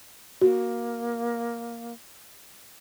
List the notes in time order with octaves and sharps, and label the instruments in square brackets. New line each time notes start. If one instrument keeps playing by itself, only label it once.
[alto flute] A#3 [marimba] F#4